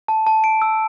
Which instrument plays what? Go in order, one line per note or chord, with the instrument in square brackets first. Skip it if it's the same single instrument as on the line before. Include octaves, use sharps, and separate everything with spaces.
[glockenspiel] A5
A5
D7
E6